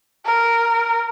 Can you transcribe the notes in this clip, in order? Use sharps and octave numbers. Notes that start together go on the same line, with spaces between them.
A#4